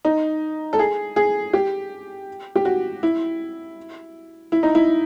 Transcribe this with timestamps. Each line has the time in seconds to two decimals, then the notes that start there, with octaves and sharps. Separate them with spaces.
0.05 D#4
0.73 A4
0.79 G#4
1.16 G#4
1.53 G4
2.56 G4
2.65 F#4
3.03 E4
4.52 E4
4.63 D#4
4.75 E4